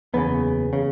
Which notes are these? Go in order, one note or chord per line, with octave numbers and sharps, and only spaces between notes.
F#1 E2 C#3 B3
C#3